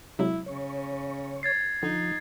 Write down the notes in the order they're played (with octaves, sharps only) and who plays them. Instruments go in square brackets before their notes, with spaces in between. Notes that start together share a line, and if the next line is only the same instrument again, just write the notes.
[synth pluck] C3 F#3 G#3 [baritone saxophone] E4
[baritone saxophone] C#3 [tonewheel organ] C#5
[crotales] G#6 A6 C7
[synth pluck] D3 [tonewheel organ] F3 [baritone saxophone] D#4